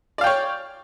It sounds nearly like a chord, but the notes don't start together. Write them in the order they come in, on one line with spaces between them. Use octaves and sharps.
D5 F5 G5 C#5